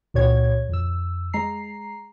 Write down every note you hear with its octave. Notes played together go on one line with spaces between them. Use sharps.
C#2 A#2 F#4 C#5 G#6
F2 E6
G#3 A#5 C7